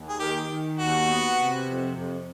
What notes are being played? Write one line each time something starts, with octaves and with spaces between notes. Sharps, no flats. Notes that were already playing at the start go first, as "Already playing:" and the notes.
Already playing: D#2
G#4
D#3 G4
D#3
D#2 F#4
B3
C3
F2
F2